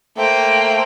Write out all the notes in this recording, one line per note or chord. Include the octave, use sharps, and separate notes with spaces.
A3 A#3 C5 G5